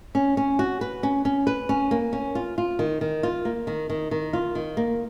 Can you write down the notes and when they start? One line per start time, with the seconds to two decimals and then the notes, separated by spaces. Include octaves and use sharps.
0.15 C#4
0.37 C#4
0.59 F#4
0.81 B4
1.03 C#4
1.25 C#4
1.47 B4
1.69 C#4
1.91 A#3
2.13 C#4
2.35 F4
2.58 F4
2.79 D#3
3.01 D#3
3.23 F4
3.45 A#3
3.67 D#3
3.89 D#3
4.11 D#3
4.33 F4
4.55 D#3
4.77 A#3